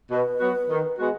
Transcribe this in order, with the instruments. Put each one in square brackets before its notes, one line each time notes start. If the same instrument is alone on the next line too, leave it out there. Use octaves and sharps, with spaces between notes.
[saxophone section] B2 [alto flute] B4
[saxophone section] F#3 B3 F#4
D#3
G#3 B3 F#4